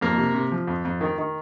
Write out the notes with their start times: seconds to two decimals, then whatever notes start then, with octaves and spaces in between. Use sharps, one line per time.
0.01 F2 A#3 A#4
0.18 C3
0.34 C3
0.52 F3
0.68 F2
0.85 F2
1.01 D#3
1.18 D#3